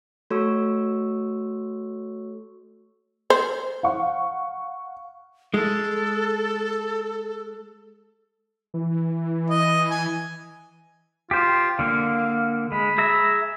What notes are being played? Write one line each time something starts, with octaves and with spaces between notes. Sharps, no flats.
A3 F#4 A4 C#5 C#6 E6
C5
F5 F#5 C#6
G#3 A4
E3
D#5
G#5
F4 G4 C5
D3 A#3 F5
G#3 B5
G#4 E5 A#5